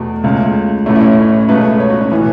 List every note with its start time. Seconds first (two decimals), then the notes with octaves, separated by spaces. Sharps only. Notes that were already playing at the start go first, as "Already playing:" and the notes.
Already playing: E2 B2 A3
0.24 C#2 C#3 A3
0.86 A1 A2 A3 C#4
0.96 E4
1.02 C#4
1.49 C#2 B2 A3 B4
1.80 C#5
1.90 F#4
2.01 C#4
2.11 A2 E3 B3